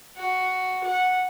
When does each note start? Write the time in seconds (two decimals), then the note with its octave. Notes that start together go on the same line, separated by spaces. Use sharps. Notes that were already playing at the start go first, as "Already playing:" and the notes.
0.16 F#4
0.84 F#5